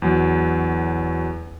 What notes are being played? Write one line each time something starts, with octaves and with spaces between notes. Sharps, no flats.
E2 F#3